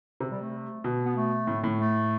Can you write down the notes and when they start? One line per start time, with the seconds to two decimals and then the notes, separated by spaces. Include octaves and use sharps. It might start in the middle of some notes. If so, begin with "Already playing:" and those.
0.20 C3
0.31 G3
0.41 A3
0.84 B2
1.05 B3
1.16 A3
1.47 A2
1.64 A2
1.80 A3